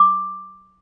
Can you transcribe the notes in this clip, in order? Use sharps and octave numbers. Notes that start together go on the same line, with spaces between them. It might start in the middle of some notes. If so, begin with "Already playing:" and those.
Already playing: D6